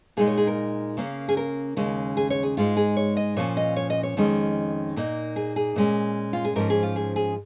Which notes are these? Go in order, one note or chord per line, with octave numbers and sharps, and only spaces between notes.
A#2 G#3 D#4 G#4
C#5
G#4
A#4
C#3 A#3 C#4
G#4
A#4
D#2 C#3 G#3 C#4
G#4
C#5
G#4
G#2 G#3 D#4 F4
G#4
C#5
D#5
A#2 F3 C#4 C#5
D#5
C#5
D#5
C#5
F2 D#3 G#3 C#4
A#2 A#3 D#4
G#4
G#4
A#2 G#3 C#4
F4
G#4
G#2 F3 C#4 A#4
G#4
F4
G#4
G#4